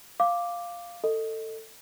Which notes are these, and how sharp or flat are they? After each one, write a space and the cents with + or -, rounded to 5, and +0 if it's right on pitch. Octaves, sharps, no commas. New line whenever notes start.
F5 +0 D6 +0
A4 +20 D#5 +5